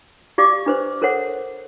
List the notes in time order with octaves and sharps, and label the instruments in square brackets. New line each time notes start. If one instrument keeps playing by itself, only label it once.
[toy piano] G4 D5 F5 D6
D4 B4 C5
A4 A#4 C5 C#5 F#5